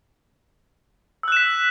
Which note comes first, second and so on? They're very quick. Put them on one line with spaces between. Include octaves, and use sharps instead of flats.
E6 F#6 E7 B6